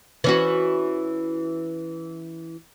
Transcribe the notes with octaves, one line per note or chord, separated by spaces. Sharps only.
E3 C#4 F#4